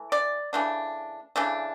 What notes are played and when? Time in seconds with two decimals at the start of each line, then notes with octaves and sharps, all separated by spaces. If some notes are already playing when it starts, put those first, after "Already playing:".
Already playing: E3 A3
0.12 D5
0.53 C#3 E3 A3 D4
1.36 C#3 E3 A3 D4